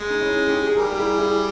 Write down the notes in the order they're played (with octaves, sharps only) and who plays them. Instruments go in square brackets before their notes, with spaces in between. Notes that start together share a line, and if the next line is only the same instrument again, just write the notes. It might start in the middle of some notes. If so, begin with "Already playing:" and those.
Already playing: [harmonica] G#3
[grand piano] D#4
C#4 E4
G#4
D#4 G4
G#4
[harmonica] G3 [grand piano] G4 A#4
[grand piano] G4
E4 G#4
E4 G#4